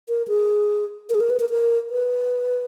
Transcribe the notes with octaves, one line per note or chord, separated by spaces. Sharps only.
A#4
G#4
A#4
G#4
A#4
B4
A#4
A#4
B4